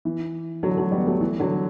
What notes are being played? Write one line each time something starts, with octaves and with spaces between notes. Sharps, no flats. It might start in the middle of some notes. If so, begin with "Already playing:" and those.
E3
D3 F#3
F#3 A3
G3 B3
F#3 A3
E3
D3 F#3